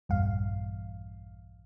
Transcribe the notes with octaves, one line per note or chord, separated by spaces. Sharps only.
A#1 E2 G2 F5